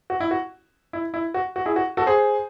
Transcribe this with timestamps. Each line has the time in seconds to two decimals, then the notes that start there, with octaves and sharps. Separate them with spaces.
0.10 F#4
0.20 E4
0.31 F#4
0.93 E4
1.14 E4
1.34 F#4
1.56 F#4
1.66 E4 G#4
1.76 F#4
1.97 F#4 A4
2.06 G#4 C5